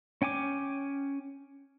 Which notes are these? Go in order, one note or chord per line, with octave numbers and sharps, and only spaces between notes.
C#4 G5 G#5 D6